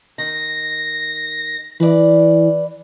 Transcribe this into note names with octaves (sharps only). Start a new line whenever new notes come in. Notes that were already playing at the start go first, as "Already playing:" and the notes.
D#3 A#6
E3 B4 D5